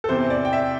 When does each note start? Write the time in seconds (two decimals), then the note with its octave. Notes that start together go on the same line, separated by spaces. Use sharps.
0.04 A4
0.09 E2 C3 E3 C4 C5
0.30 D5
0.45 G5
0.53 E5